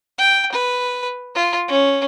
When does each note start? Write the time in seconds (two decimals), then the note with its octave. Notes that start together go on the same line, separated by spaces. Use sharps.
0.18 G5
0.52 B4
1.35 F4
1.68 C#4